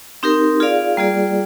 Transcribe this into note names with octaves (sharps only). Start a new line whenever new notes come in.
C4 D#4 G4 A#4
F4 G#4 D5 F5
G3 A#3 F4 G#4 D5